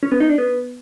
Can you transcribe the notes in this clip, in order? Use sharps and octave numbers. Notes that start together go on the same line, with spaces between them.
C#4
B3
D#4
D4
B3